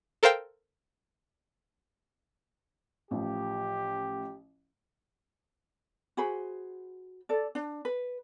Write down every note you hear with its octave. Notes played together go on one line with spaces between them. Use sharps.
A4 A#4 C5 F5 G5
A1 F3 G4
F#4 G#4 C5 B5
A4 D5
D4
B4